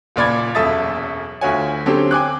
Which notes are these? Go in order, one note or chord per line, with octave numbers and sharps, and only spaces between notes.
F#1 A#2 D5 B5 G#6
E1 F#2 A4 E5 D#6 A6
D2 F4 F#4 C#5 G#5
D3 F#3 C4 C#4 G4 A4
G5 G#5 D6 F#6